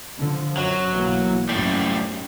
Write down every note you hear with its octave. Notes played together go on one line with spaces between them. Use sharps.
D3 F3
F#2 F#3
B1 E3 A#3
F#2 A2 G3